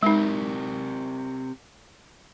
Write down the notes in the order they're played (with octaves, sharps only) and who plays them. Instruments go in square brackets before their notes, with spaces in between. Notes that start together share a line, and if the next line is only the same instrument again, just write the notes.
[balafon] G#3 D#4 [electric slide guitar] C4 G4 A#4